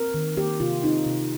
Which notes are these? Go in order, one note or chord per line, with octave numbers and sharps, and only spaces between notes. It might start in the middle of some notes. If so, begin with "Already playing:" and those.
Already playing: C4 A#4
D#3
A#3 G4
C3 F4
C4 D#4
C3